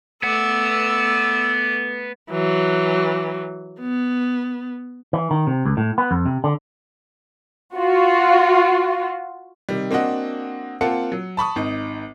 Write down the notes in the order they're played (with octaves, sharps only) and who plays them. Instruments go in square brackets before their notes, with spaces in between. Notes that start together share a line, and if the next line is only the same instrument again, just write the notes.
[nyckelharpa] A3 D5 [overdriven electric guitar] B3 F#5 [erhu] E6
[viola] E3 F#3
B3
[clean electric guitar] E3
D#3
C3
C#2
A2
B3
F2
C3
D3
[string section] F4 F#4
[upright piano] C3 D#3 G3
A#3 C4 D4 F#4 D#5 F#5
A#3 C4 F4 F#5 A5 C#7
F#3
A5 B5 C#6 D#6
G#1 D#4